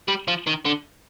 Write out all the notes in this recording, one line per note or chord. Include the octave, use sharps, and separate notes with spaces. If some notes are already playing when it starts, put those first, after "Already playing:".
G3
F3
D#3
D3